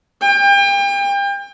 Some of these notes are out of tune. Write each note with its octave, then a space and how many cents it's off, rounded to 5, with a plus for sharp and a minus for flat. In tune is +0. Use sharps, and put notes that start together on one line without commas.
G5 +35